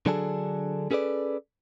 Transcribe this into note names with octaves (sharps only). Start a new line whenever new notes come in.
D3 F#3 D4 G#4 A4
C#4 G#4 A4 B4 D5